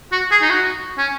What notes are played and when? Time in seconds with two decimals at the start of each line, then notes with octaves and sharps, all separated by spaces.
0.12 F#4
0.31 G#4
0.42 D#4
0.49 F#4
0.97 C#4